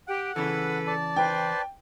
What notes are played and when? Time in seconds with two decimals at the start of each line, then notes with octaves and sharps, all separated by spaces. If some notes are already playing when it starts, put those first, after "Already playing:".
0.07 G4 F#5 G5
0.36 C#3 E3 A4 B4 E6
0.87 D5 A5
1.16 B4 C5 G5